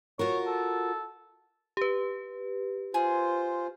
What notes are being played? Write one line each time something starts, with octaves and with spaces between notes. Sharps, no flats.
F4 F#4 A#4 C#5
A4
G4 B4
F4 G#4 C5